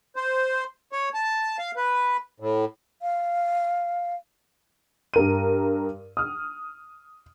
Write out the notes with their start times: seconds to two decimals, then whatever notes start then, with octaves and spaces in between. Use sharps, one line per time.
0.16 C5
0.92 C#5
1.14 A5
1.58 F5
1.76 B4
2.40 A2
3.02 F5
5.14 G2 A#4 D#7
6.17 D#6 F6